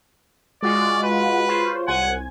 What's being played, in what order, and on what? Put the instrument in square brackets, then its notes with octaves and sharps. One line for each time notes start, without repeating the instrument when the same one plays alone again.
[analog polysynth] G#3 F4 F#4 [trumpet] D5
[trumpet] B4
[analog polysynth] F4 C5 C#5
[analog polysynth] C2 G#5 G#6 [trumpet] F#5